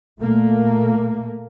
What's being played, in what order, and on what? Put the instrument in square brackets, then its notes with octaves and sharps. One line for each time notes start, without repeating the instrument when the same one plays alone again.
[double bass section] A#2 A3 A#3